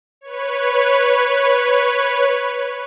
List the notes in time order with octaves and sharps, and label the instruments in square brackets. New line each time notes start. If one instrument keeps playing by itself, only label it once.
[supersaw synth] B4 C#5